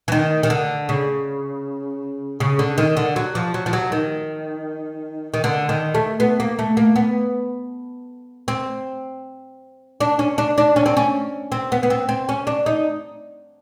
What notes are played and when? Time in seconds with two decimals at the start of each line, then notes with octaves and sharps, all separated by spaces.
0.08 E3
0.12 D#3
0.43 D#3
0.50 D3
0.89 C#3
2.40 C#3
2.59 D3
2.78 D#3
2.97 D3
3.16 F#3
3.35 F3
3.54 F#3
3.66 F3
3.73 F#3
3.92 D#3
5.34 D#3
5.44 D3
5.69 D#3
5.95 A3
6.20 B3
6.40 A#3
6.59 A3
6.77 A#3
6.96 B3
8.48 C4
10.00 D4
10.19 C#4
10.38 D4
10.58 D4
10.76 C#4
10.86 C4
10.97 C#4
11.52 C4
11.72 B3
11.83 B3
11.90 C4
12.09 C4
12.29 C#4
12.47 D4
12.66 D#4